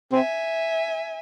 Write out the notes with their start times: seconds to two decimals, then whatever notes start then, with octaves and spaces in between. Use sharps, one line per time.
0.12 C4 E5 G#5